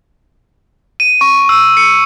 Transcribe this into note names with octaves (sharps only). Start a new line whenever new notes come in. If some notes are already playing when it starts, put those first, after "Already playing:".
D#7
C#6
E6
C#7